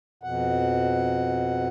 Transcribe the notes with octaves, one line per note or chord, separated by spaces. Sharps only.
F2 B2 F#5